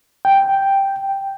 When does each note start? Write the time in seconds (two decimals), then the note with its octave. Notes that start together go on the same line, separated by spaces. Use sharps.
0.25 G5